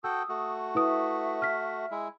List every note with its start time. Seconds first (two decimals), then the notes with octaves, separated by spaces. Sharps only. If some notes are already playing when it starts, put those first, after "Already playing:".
0.04 F#4 A4 G5 D#6 E6
0.29 A3 F#4
0.75 E4 B4 E5 D#6
1.42 F6 B6
1.91 G#3 E4